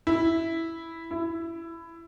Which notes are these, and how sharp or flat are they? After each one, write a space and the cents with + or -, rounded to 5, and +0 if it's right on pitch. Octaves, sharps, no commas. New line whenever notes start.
E4 -5
E4 +15